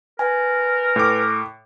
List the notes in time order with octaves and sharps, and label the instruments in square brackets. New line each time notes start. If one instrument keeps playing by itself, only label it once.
[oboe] A#4 [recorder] B4 [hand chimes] G#5
[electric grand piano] A2 D6